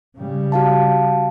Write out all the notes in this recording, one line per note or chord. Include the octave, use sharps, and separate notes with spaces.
C#3 G3
F#4 F5 A5